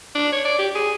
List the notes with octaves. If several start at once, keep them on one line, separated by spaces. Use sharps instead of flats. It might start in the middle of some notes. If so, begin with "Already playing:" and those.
D4
C#5
D5
G4
G#4